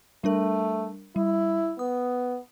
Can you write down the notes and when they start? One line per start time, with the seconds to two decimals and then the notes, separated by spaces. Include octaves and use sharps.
0.24 G3 A3 D4 A#4
1.16 G3 E4
1.79 B3 D#6